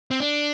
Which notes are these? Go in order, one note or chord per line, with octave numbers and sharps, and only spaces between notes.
C4
D4